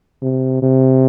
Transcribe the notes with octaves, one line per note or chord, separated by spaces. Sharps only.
C3
C3